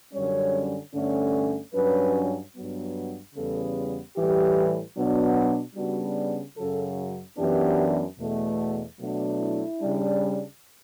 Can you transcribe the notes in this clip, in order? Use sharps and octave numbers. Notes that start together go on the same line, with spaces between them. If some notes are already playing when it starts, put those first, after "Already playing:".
F#2 D3 G3 C#4 C#5
G2 D3 A3 C#4
G2 F#3 C#4 B4
G2 F#3 B3
E2 C#3 G3 B3 A4
A2 E3 G3 G4
B2 F#3 B3 D4
C#3 G3 B3 D4 F#4
F#2 C#3 F#3 A4
F#2 E3 B3 D4 G4
E2 B2 A3
B2 F#3 A3 D4
E4
C#3 G3 D4